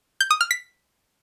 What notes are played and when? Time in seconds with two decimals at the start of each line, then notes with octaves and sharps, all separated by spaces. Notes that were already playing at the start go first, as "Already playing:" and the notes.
0.20 G6
0.31 D#6
0.41 F6
0.51 B6